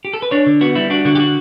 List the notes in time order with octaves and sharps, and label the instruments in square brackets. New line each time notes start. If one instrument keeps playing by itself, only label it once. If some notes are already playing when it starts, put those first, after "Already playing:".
[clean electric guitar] G4
A4
B4
D4 C#5
D3
B3 F#4
G3 E4
D4 F#4
D3 F#4
G4
F#4